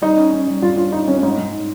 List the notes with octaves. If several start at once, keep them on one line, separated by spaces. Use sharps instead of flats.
G3 D#4
C#4
C#4
G3
G2 F4
C#4 F4
D#4 F4
G3 C#4
C#4
G#2 D#4
G#2